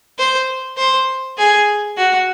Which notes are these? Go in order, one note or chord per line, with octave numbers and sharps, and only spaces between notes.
C5
C5
G#4
F#4